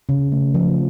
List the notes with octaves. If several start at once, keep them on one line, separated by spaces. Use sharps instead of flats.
C#3
A3
F3